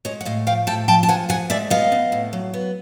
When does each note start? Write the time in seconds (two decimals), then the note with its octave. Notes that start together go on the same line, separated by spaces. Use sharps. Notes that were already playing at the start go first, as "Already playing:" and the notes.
0.05 G#3 C#5 D#5
0.21 F#5
0.25 A2 D#5 F5
0.47 F3 F5 G5
0.67 A2 G5 A5
0.88 F3 G5 A5
1.03 A5
1.08 F3 F#5 G#5
1.29 F3 F#5 G#5
1.50 G#3 D5 E5
1.70 B3 D#5 F5
1.92 B3
2.12 A2
2.33 F#3
2.54 B3